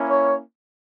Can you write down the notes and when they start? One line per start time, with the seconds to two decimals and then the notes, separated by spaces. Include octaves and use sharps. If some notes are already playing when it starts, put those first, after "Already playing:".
Already playing: A#3 C#4 E4
0.08 C#5